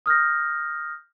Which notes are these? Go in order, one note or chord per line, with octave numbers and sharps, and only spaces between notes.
D#6 F6 G6 A#6